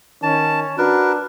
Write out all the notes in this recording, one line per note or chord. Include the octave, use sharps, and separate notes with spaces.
D#3 C#4 A5
D4 F#4 A#4 B4